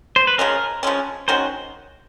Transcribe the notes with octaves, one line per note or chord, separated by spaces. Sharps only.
C5
B4
C#3 F3 G#3 C#4 A#4
C#3 F3 G#3 C#4
D#3 G#3 C#4 F#4 C5